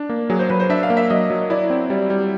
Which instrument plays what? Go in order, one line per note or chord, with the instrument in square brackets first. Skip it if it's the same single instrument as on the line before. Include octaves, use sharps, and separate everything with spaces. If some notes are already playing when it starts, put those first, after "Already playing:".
Already playing: [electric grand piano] D4
A#3
[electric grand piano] F#3 [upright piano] G#4
[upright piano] C5
[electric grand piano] F#3 [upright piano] B4
[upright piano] C5
[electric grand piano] D4 [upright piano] E5
[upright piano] F5
[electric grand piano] A#3
[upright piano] E5
[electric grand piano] F#3 [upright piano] D#5
[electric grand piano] F#3
[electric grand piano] E4 [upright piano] D5
[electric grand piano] C4
[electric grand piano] G3 [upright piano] D5
[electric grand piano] G3